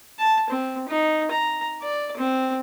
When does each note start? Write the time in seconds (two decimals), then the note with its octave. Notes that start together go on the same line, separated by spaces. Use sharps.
0.19 A5
0.50 C4
0.88 D#4
1.31 A#5
1.83 D5
2.17 C4